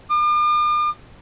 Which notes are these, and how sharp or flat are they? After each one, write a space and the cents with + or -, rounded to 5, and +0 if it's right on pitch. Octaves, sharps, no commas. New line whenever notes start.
D6 +45